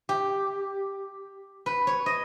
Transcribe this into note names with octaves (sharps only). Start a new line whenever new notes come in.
G4
B4
C#5
D#5